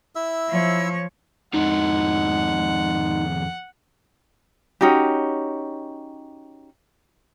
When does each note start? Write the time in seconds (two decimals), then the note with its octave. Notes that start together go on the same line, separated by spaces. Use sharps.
0.15 E4 E5 E6
0.50 F3 C#5
1.54 F2 D#3 G#3 D#4 F#5
4.81 C#4 D#4 F#4 G4